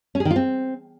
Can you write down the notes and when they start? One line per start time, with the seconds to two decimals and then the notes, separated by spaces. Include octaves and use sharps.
0.15 C#4
0.20 G#4
0.25 D#3
0.31 F4
0.36 C4